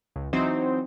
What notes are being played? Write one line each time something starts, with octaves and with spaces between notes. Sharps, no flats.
C#2
E3 F#3 C4 D#4 C5